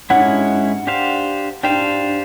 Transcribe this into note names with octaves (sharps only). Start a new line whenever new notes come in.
G#3 C#4 E4 F#5
D4 G4 C5 F5
D4 G4 C5 F5 G5